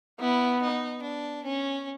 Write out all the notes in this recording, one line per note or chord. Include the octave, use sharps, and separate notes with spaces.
B3 E4
D#4
D4
C#4